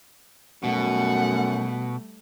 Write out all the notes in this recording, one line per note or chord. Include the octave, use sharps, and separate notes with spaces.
F#2 B2 G3 A3 F#5